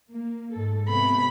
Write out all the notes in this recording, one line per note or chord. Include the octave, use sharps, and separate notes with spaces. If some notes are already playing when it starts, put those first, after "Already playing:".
A#3
G#2 A4
C3 B3 B5